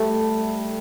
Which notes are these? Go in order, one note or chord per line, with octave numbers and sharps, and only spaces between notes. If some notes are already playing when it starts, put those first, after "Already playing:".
Already playing: G3 A3